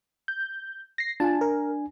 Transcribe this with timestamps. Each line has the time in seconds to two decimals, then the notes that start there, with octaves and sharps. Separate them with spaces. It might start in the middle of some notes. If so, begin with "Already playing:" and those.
0.28 G6
0.98 A#6 C7
1.20 D4 F4 G#5 A5
1.41 A#4